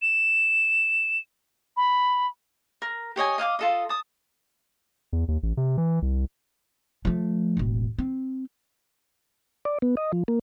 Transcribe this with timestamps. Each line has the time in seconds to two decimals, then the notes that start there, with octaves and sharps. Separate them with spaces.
0.02 E7
1.77 B5
2.82 A#4
3.16 G4 C#5 D#5 G#5
3.38 D#5 F5 G5 D6
3.59 F4 A4 D#5
3.89 A5 D#6
5.13 E2
5.28 D#2
5.43 A1
5.57 C3
5.78 E3
6.02 C2
7.05 F3 A3
7.57 E1 A1
7.99 C4
9.65 D5
9.82 B3
9.97 D#5
10.12 F3
10.28 A#3